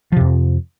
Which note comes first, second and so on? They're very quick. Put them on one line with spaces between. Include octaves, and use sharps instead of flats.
F3 C3 F2